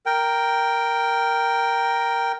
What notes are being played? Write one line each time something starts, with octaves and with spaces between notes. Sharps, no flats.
A#4 G5